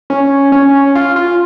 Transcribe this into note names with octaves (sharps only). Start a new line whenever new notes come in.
C#4
C#4
F4
F4